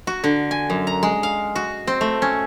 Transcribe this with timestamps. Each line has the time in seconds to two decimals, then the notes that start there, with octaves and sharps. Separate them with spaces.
0.07 F#4
0.24 D3
0.51 G#5
0.70 F#2
0.87 A#5
1.03 G#3
1.23 F5
1.55 F#4
1.87 C4
2.01 A3
2.22 C#4